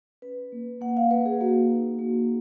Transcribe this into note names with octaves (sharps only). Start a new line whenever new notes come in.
C#4 B4
A#3
A#3 F#5
F5
A#3 B4
G#4
A#3 F#4
D#4
A#3